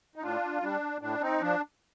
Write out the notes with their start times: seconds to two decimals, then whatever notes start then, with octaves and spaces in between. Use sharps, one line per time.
0.16 D#4
0.22 A2 D4 F4
0.62 G3 D4
1.01 A2 D4
1.21 C4 D#4
1.41 F3 D4